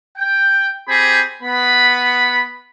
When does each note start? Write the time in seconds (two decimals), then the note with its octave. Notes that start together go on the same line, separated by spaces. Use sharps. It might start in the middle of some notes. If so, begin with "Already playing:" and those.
0.18 G5
0.88 C4 G4 G#4 B5
1.42 B3 B5